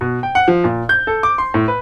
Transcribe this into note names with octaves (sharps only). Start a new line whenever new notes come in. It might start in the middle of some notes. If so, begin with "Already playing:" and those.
B2
G5
F#5
F3
A#2
G6
A4
D6
C6
A2
B4